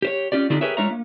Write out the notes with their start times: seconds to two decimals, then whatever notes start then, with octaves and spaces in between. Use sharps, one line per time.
0.02 G4 C5 C#5
0.32 C#4 F4 G4 D5
0.50 D3 C4 D4 D#4 F4 G4
0.61 G4 G#4 A#4 B4 C#5 E5
0.77 G#3 D4 F4 C#5 E5 A#5
0.90 A#3